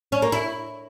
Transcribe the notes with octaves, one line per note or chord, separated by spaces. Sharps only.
C#4
A#3
E4